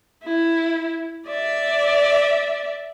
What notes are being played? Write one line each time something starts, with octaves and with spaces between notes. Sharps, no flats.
E4
D5 E5